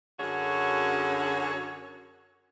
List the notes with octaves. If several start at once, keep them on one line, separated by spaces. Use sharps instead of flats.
F#2 D3 C#4 F#4 G#4 C#5